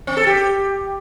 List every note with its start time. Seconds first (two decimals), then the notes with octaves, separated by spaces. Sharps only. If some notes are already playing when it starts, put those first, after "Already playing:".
0.07 C4
0.17 A4
0.27 G4